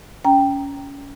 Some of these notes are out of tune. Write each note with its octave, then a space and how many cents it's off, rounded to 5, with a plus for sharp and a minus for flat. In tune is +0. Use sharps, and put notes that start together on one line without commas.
C#4 +20 G5 +0 A#5 +0